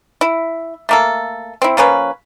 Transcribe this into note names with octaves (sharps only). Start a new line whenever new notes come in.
E4
A3 A#3 A4
C4 E4
F3 A#3 C#4 B4